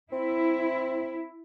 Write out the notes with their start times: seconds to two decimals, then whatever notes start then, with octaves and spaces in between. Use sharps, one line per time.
0.13 C4 E4